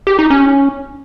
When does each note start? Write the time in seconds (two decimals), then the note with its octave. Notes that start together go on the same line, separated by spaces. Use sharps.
0.07 G4
0.19 D#4
0.30 C#4